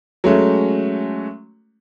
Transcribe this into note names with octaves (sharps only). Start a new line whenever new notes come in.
F#3 G#3 A3 C#4